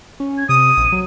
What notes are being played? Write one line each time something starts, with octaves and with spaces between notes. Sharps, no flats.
C#4
G#6
C3 D#6 D#7
A#1
F#3